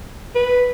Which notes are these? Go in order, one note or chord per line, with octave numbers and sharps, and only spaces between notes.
B4